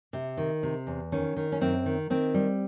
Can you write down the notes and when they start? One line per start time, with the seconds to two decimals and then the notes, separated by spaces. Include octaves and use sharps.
0.13 C3
0.38 D#3
0.63 C3
0.87 E2
1.12 D#3 C#4
1.37 D#3
1.52 C#4
1.61 F#2 C4
1.86 D#3
2.10 D#3 C4
2.34 G3